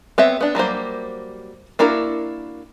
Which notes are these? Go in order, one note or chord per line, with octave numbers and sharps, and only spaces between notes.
B3 C4 C#5 E5
B3 D4
F#3 G3 A#3 C5
A#3 D4 E4 F#4 A#4